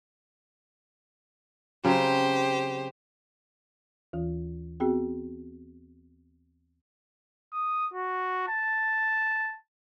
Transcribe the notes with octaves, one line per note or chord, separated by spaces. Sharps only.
C#3 F#3 C4 G4 C5
D#2 E3 F4
B3 C4 F#4 G#4 G5
D#6
F#4
A5